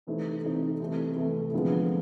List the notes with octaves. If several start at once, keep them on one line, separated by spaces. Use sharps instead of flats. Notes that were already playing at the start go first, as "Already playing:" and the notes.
C3 E3 A3 C4 D#4
C3 E3 A3 C4 D#4
C2 C3 E3 A3
C2 C3 E3 A3
F2 D3 F3 G#3 B3